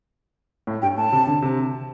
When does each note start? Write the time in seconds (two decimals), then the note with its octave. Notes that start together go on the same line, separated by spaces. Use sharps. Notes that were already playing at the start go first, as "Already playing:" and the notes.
0.67 A2
0.82 G2 G5
0.97 A2 A5
1.12 C3
1.27 D3
1.42 C3